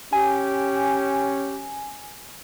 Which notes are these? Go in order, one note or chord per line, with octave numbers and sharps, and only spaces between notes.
C#4 G4 G#5